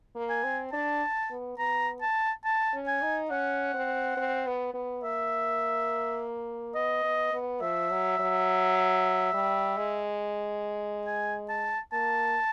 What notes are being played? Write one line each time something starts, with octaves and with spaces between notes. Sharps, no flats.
A#3
G#5
C4
D4 A5
B3
B3 A#5
A5
A5
C#4
G#5
D#4
C#4 F#5
C4
C4
B3
B3
A#3 E5
B3 D#5
B3
B3
F3 E5
F#3
F#3
G3
G#3
G#5
A5
A#3 A5